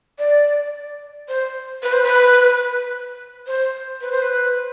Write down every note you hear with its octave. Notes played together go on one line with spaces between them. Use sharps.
D5
C5
B4
C5
B4
C5
B4
C5
B4